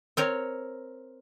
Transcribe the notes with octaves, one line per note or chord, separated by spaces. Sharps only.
C4 A#4 C#5